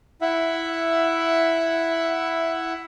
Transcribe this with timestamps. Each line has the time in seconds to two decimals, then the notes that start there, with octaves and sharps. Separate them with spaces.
0.21 E4 E5 F#5